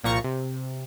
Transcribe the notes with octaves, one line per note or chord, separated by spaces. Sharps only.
C2 A#2 F3 A#5 C#6
C3